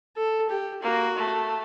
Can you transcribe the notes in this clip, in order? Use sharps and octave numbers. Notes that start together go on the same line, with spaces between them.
A4
G4
A#3 F#4
A3